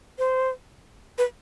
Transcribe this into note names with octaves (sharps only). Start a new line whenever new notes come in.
C5
B4